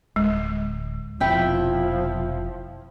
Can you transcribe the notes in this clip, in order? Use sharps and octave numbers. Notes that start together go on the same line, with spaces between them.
D1 G#3
F1 B2 F3 C4 E4 G5